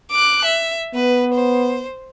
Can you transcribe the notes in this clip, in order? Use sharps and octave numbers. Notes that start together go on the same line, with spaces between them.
D6 F#6
E5
B3 B4
C5